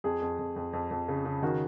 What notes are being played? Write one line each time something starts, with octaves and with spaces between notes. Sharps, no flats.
F2 G#4
F2
F2
F2
F2
F2
C#3
C#3
D#3 F#4